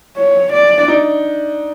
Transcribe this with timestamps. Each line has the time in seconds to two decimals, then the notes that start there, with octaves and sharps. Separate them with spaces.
0.17 C#5
0.53 D5
0.78 D4
0.88 D#4